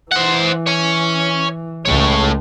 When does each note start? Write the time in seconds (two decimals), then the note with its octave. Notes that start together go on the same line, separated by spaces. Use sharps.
0.12 E3 C5 F#5
0.67 C#5 G#5
1.86 C#2 G#3 A3 C#5